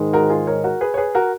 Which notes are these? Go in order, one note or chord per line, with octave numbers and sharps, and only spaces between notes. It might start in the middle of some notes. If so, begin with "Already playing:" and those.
Already playing: G#2 D#3 G#3
F#4 A#4
F4 G#4
A#4 C#5
F#4 A#4
G#4 B4
C#5
G#4 B4
F#4 A#4